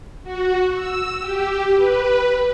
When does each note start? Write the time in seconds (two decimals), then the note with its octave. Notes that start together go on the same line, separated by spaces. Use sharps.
0.24 F#4
0.74 E6
1.20 G4
1.76 B4